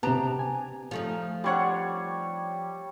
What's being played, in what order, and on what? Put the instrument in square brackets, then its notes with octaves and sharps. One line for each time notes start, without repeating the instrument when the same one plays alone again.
[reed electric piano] C3 B3 [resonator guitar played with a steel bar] D4 A5 A#5 [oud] G4
[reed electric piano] G#5
[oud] F3 A3 D#4
[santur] G3 C#5 [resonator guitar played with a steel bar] C4 D4 F#5